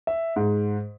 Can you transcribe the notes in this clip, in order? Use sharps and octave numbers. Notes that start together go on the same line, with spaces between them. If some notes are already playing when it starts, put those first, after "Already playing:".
E5
G#2